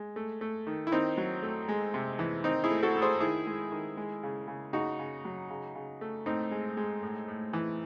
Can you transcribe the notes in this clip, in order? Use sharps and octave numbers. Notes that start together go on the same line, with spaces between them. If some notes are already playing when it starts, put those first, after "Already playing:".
Already playing: G#3
A3
A3
D#3
E4
D#3 C4 D#4
F#3
A3
G#3
C3
E3
D#3 C4 D#4
E4 G#4
A3
F#4 A4
A3
G#4 C5
D#3 E4 G#4
G#3
D#3
G#3
C#3
C#3
C#3 D#4 F#4
C#3
F#3
C#3
C#3
A3
A2 C4 D#4
G#3
G#3
A2
A2
E3